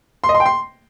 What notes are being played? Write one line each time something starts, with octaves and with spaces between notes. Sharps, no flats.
C6
D#5
C6
G5
C6